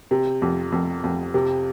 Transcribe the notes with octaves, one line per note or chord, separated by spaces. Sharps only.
C3
F2
F2
F2
C3